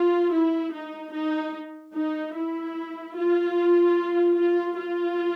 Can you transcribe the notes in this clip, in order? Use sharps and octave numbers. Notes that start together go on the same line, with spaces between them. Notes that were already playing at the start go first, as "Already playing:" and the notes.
Already playing: F4
E4
D#4
D#4
D#4
E4
F4
F4
F4